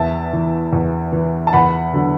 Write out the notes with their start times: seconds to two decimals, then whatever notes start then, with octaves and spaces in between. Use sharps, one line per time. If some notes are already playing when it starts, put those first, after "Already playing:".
Already playing: E2 E5 A5
0.33 E3
0.73 E2
1.12 E3
1.47 A5
1.53 E2 F#5 B5
1.93 D3 F#3